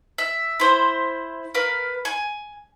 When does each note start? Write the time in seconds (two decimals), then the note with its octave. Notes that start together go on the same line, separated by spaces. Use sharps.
0.18 E5
0.60 E4 C5
1.55 A#4 B4 F5
2.05 G#5